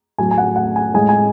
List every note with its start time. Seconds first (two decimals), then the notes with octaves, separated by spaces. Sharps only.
0.18 A2 F#3 A3 G#5
0.31 G#5
0.38 F#5
0.56 F#5
0.76 G#5
0.94 A2 G#3 G#5
1.09 G#5